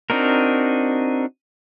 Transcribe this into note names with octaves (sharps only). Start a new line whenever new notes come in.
C4 D4 D#4 F#4 A#4